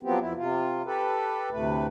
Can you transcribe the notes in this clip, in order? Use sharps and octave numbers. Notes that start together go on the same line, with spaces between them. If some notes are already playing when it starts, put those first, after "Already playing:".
F3 F#3 B3 C4 G4
F2 E4
C3 F4
G4 A4 B4
D2 A2 C3 A3 B4